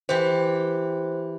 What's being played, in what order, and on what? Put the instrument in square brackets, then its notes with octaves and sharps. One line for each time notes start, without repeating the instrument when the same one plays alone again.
[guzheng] E3 G4 [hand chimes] C5